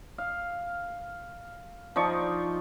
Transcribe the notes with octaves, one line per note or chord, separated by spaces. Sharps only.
F5
F3 D#4 D5 C#6